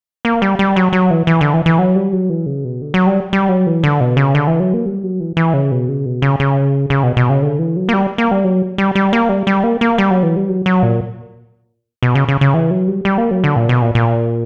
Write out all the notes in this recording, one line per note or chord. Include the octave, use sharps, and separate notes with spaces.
A#3
G3
G3
F#3
F#3
E3
E3
D3
E3
E3
F#3
G3
F#3
E3
C#3
B2
D3
F#3
G3
G3
F#3
E3
D3
B2
C#3
D3
E3
F#3
A#3
G3
F#3
E3
E3
C#3
B2
C#3
B2
C#3
C#3
C#3
B2
B2
C#3
D3
E3
F#3
A#3
G3
A#3
G3
F#3
G3
G3
A#3
G3
G3
A#3
A#3
G3
F#3
E3
G3
F#3
F#3
A#2
B2
C#3
C#3
C#3
E3
F#3
G3
G3
A#3
F#3
D3
A#2
B2
A#2
A#2